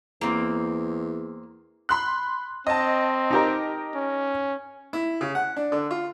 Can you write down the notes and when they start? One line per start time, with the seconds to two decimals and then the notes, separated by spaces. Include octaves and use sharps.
0.21 E2 A#3 C4
1.89 B5 C6 F#6
2.67 C4 D#5 A5
3.31 D#4 G4 A#4
3.95 C#4
4.93 E4
5.21 C#3
5.35 F#5
5.56 D4
5.72 D3
5.91 F4